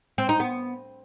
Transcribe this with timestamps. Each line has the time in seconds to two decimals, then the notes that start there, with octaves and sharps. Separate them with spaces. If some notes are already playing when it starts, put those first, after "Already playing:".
0.18 C4
0.29 D#4
0.40 B3